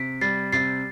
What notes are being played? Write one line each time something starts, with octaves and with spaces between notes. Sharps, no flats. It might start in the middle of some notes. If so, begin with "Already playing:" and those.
Already playing: C3 B6 D7
G3 A6 C7
C3 A6 C7